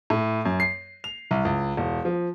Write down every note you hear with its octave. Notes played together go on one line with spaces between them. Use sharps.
A2
F#2
C7
F7
C2
C#2
E1
F3